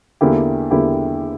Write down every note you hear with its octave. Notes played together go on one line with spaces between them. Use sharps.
E2 D3 A#3 E4 G4
E2 D3 A#3 E4 G4